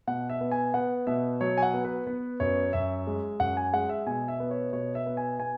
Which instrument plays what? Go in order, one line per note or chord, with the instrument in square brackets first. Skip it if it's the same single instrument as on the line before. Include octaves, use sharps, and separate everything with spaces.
[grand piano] B2 F#5
E5
B3
G#5
B3 F#5
B2 E5
F#3 C#5
G#5
F#5
B3
B4
B3 B4
F#2 C#5
F#2 E5
G#3
F#2 F#5
G#5
G#3 F#5
E5
B2 G#5
E5
B3
C#5
B2 C#5
E5
B3
G#5
B3 G#5